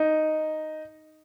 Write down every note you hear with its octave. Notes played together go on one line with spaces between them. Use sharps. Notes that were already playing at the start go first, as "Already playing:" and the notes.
Already playing: D#4